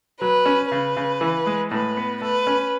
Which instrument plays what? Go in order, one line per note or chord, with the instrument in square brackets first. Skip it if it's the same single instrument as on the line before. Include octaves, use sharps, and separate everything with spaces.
[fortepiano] F#3 [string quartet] B4
[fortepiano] C#4
[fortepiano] C#3 [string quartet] B4
[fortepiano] C#3
E3
G#3
[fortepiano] A2 [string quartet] B4
[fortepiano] B3
[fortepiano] A3 [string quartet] B4
[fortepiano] C#4